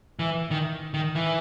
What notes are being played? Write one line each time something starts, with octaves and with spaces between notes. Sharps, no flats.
E3
D#3
D#3
E3